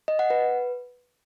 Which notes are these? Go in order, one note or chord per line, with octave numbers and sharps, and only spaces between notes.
D#5
F#5
B4